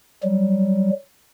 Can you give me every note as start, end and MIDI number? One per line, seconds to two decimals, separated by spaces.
0.23 0.90 54
0.23 0.90 55